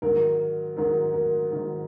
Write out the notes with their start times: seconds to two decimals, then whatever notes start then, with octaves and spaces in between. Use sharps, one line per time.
0.02 G#2 D#3 F#3 A#4
0.76 G#2 D#3 F#3 A#4
1.14 A#4
1.51 G#2 D#3 F#3